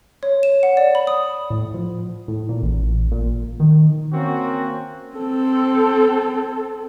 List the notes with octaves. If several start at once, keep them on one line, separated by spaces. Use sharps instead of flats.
C#5
E7
F#5
D5
B5
D#6
A2
F3
A2
A#2
A1
A#2
D#3
A#3 C4 C#4 F#4
C4 A4